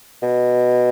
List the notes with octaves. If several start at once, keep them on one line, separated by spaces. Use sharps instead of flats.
B2